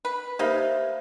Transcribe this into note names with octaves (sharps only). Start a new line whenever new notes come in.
B4
A#3 D#4 G4 C5 E5